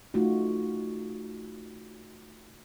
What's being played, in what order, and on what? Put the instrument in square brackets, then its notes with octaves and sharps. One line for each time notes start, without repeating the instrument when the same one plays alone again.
[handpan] A3 D#4 F4 F#4